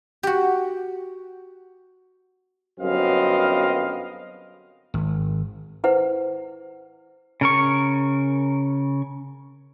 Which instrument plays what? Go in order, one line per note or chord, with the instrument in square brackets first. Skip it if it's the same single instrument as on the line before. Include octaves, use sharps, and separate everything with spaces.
[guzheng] F#4 G4
[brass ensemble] G1 F#2 B3 C4 D#5 F5
[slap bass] G#1
[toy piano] E4 B4 C5 F#5
[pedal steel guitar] C#3 A#4 C#6